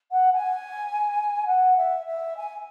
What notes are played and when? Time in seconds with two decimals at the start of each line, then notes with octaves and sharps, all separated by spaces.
0.11 F#5
0.33 G#5
1.46 F#5
1.77 E5
2.06 E5
2.37 G#5